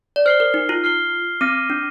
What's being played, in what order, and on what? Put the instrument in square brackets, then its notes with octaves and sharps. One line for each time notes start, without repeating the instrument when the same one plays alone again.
[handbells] D5
[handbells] C5 [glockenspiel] F6 C7 G7
[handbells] A#4
D#4
F4
[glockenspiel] F6 C7 G7
[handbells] C4 [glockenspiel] D6 F6 A#6 D#7
[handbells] D4